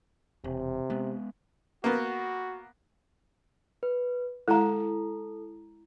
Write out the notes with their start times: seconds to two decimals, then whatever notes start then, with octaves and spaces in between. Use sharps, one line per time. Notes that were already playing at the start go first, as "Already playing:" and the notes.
0.44 E1 C3
0.90 G#3 B3
1.84 A#3 B3 F#4
3.83 B4
4.48 G#3 E4 A4 F5 A#5